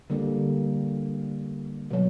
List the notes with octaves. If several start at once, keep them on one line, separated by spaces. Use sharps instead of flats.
D3 G3 A#3
B2 F#3